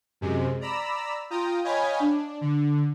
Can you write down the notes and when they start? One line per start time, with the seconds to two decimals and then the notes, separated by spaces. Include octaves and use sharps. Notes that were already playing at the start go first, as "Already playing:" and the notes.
0.21 F#2 C3 G#3
0.61 D5 A#5 B5 E6
1.30 F4 G5 A#5 D#6
1.64 C#5 D#5 F5 G5 G#5 B5
2.00 D4
2.41 D3